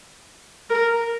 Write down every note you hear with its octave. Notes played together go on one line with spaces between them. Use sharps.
A#4